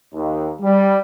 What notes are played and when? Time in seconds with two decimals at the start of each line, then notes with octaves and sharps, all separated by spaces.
0.12 D#2
0.60 G3